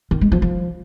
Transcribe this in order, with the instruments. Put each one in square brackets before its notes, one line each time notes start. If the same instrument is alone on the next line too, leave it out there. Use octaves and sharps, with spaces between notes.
[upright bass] D#3
G#3
F3
F3